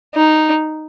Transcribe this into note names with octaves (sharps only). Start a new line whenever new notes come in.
D#4